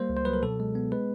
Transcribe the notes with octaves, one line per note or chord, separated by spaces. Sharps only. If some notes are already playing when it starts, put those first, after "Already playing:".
Already playing: G3 A#3 C5
C#2
C5
F#3 B4
A#4
B2 A4
G#3
B3
G#3 B4